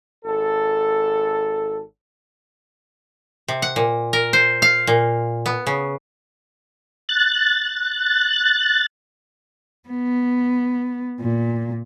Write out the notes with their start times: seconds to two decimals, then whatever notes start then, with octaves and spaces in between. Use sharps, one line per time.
0.24 G#1 A4
3.48 C3
3.62 F#5
3.76 A#2
4.13 A#4
4.33 C5
4.62 F5
4.87 A#2
5.46 B3
5.67 C#3
7.09 F#6 A6
9.89 B3
11.21 A#2